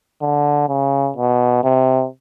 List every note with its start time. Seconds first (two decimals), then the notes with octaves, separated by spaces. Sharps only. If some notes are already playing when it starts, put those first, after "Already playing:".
0.22 D3
0.69 C#3
1.16 B2
1.64 C3